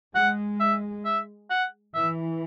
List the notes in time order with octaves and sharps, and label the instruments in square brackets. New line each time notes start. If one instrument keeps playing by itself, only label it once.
[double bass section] G#3 [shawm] F#5
[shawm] E5
E5
F#5
[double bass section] E3 [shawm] E5